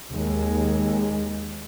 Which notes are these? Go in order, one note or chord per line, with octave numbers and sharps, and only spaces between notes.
D#2 G#3